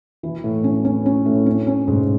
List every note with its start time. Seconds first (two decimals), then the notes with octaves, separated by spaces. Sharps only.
0.23 E3
0.44 A2
0.64 C#4
0.85 C#4
1.06 C#4
1.26 A2
1.46 C#4
1.67 C#4
1.88 G#2